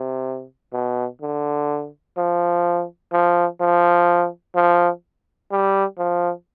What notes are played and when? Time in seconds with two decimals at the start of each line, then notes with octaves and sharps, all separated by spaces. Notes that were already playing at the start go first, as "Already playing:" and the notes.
Already playing: C3
0.73 B2
1.21 D3
2.17 F3
3.12 F3
3.60 F3
4.55 F3
5.51 G3
5.98 F3